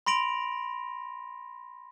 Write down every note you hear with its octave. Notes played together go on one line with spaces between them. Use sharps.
B5 C6 A#6 D7 F7 F#7